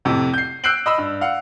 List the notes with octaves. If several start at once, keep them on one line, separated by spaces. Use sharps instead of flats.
F2 A2 C3
G6 C7
E6 F#6 G6 C7 D7 F#7
D#5 B5 E6
G2
F5 F#5